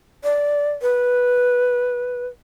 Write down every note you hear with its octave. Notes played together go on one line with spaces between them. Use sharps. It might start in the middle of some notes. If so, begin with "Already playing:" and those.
D5
B4